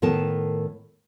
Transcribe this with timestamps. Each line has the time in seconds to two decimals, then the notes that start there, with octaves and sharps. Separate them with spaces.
0.02 A2 D#3 B3 A#4 A5